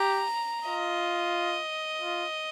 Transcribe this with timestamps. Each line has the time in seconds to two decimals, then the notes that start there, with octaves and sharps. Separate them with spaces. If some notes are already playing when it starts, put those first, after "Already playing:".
Already playing: G4 A#5
0.67 F4 D#5
2.02 F4